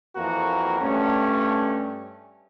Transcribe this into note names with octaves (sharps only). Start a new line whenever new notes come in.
F2 E3 A#3 F#4 A#4
G2 A3 C#4